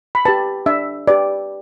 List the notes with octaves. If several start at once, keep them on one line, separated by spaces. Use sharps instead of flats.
B5
G4 B4 A5
D4 E5
G4 B4 D5